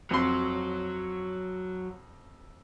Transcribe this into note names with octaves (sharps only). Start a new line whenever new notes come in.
F2 F#3 C6